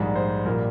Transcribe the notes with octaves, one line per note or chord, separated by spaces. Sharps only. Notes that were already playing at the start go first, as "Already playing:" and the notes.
Already playing: A#1 G#2 G3 G#4
C5
A#1 A#2 G3 A#4